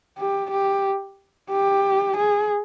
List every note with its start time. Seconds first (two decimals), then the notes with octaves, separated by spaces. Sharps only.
0.18 G4
0.51 G4
1.50 G4
2.17 G#4